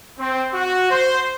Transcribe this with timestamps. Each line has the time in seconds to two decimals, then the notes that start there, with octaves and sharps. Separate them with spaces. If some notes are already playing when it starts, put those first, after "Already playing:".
0.19 C4
0.54 F#4
0.91 C5